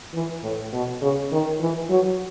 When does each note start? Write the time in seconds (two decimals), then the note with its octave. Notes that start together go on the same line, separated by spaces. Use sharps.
0.14 E3
0.44 A2
0.73 B2
1.02 C#3
1.32 D#3
1.60 E3
1.90 F#3